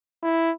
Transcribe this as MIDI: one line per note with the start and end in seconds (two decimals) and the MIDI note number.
0.23 0.51 64